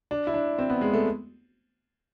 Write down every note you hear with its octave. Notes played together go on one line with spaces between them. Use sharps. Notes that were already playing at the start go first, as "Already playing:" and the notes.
D4
E4
D4
C4
B3
G#3
A3